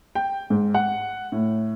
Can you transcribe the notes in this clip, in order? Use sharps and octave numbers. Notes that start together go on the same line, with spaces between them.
G5
G#2
F#5
A2